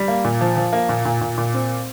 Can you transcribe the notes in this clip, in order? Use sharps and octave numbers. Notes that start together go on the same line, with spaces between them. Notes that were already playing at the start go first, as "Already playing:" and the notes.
Already playing: G3
A#3
A#2
F3
F3
A#3
A#2
A#2
A#2
A#2
C4